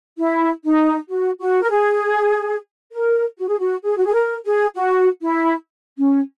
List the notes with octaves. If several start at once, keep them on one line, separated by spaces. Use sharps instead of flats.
E4
D#4
F#4
F#4
A#4
G#4
A#4
F#4
G#4
F#4
G#4
F#4
G#4
A#4
G#4
F#4
E4
C#4